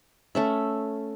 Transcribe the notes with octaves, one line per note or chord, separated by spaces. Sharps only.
A3 C#4 E5